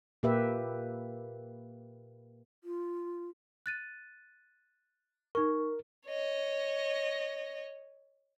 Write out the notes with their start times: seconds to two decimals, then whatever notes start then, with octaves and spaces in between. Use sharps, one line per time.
0.23 A#2 A#3 G4 B4 E5
2.64 F4
3.66 F#6 A6 D#7
5.35 D#4 A#4 C#6
6.07 C#5 D#5